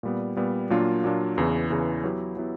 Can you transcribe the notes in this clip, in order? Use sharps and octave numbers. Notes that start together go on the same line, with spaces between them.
A#2 G3 B3
A#2 G3 B3
A#2 F#3 A#3 D4 F4
A#2 F#3 A#3 D4 F4
E2 C#3 E3
E2 C#3 E3
F#3 B3 E4 G4
F#3 B3 E4 G4